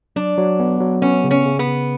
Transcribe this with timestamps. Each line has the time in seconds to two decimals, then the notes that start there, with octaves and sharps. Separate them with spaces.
0.16 F#3 D4
0.37 F#3
0.60 B3
0.80 F#3
1.02 B3 C#4
1.24 C#3
1.31 C#4
1.46 C#3
1.59 B3
1.67 C#3